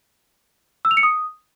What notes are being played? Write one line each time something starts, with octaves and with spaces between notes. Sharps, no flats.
E6
F7
C#7
D#6